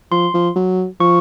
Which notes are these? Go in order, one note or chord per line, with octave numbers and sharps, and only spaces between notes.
F3 C6
F3
F#3
F3 C#6